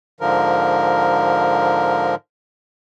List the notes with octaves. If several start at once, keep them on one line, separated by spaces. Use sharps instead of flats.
G#2 D3 F3 A#4